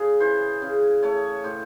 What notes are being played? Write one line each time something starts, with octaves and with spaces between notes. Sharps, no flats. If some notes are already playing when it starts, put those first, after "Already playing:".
Already playing: C#3 G#4
E3 C5
C#3
A3 C#5
A2 C5